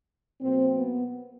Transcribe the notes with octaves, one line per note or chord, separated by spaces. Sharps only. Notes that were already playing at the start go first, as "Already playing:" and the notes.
B2 F#3 A#3 C4
B3